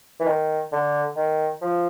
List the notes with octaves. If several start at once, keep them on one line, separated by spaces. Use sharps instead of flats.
E3
D#3
D3
D#3
F3